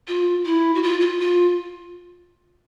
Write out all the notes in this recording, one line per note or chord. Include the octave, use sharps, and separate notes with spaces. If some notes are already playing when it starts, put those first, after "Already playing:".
F4
E4
F#4
F4
F4
F4